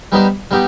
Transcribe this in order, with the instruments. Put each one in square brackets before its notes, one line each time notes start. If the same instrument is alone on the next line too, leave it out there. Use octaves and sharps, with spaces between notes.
[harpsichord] G3 B3 D#4 G4 C5
G3 B3 D#4 G4